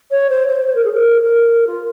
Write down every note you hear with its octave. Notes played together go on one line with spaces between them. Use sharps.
C#5
C5
C5
C5
A#4
G#4
A#4
A#4
F4